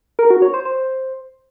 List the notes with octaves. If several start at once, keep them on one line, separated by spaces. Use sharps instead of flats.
A#4
F#4
C#5
C5
C5